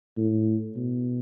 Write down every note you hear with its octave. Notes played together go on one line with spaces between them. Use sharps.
A2
B2